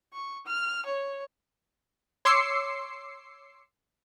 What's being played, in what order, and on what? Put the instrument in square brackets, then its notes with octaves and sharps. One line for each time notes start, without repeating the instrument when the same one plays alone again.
[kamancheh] C#6
F6
C#5
[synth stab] C#5 C6 D6 E6 C7 C#7